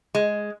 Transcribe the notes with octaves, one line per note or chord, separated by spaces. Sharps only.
G#3